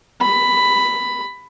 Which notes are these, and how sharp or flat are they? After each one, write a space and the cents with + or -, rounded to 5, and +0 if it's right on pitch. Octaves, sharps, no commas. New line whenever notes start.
B5 +10